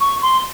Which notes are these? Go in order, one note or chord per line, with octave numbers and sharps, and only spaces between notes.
C#6
C6